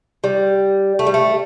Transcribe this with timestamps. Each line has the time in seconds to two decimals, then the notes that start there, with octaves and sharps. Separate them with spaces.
0.24 G3
0.99 A3
1.07 G3
1.14 A3